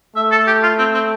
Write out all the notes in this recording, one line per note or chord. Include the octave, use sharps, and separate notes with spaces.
A3 E5
A4
G4
F4
C4
C4